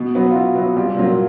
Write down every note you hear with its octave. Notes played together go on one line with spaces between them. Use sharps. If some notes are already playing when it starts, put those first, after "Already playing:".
Already playing: B2
F#3 B3
F4
B2 E4 F#4
F#3 B3
C2 F4 G4
A#2 F#3 A#3